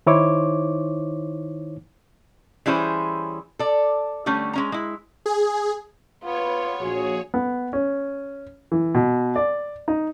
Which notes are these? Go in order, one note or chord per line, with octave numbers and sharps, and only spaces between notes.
D#3 D#4 E4 C5 C#5 D6
E3 G3 C#4 E4 G#4 C5
A4 D5
D3 G3 A3 C#4
G#3 C#4 A#5
G#3 E4
G#4
B3 F4 C#5
A#1 F#4 G#4
B3
C#4
E3
B2
D5
D#4